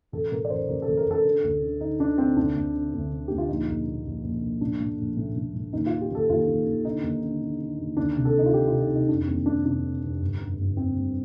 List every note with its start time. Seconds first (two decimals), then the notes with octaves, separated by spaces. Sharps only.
0.12 A1 A4
0.31 A2 A#4
0.45 D5
0.50 A1 C5
0.68 A1 A#4
0.82 A4
0.87 A1
0.97 A#4
1.07 A1 A4
1.25 D3
1.43 D2
1.62 D3
1.81 D3 D#4
1.99 D3 D4
2.18 D3 C4
2.36 D2 D4
2.55 D2
2.74 D3
2.93 D2
3.12 D3
3.28 D2 G4
3.38 F4
3.48 A#1 D#4
3.67 A#1
3.86 A#2
4.04 A#1
4.24 A#1
4.42 A#2
4.60 A2 D4
4.80 A2
4.98 A#1
5.17 A2
5.36 A2
5.55 A2
5.73 D#2 D#4
5.86 F4
5.92 D#3
6.01 G4
6.10 D#2 A4
6.29 D#2 F4
6.47 D#2
6.66 D#2
6.85 D3 D#4
7.03 D#2
7.23 D3
7.41 D3
7.60 D3
7.79 D#2
7.97 D2 D4
8.16 C3
8.25 A4
8.35 C3 D#4
8.46 F4
8.53 D#3 G4
8.68 F4
8.72 C3
8.82 D#4
8.90 C3
8.95 D#4
9.09 F1 D4
9.27 D#2 C4
9.46 F1 D4
9.65 F1 D4
9.83 D#3
10.03 F1
10.21 G1
10.40 G2
10.58 G1
10.77 G2 C4
10.96 G1